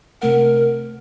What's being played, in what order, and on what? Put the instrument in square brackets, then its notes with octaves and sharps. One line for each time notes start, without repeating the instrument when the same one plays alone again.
[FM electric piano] C3 A3 F#5 [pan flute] A#4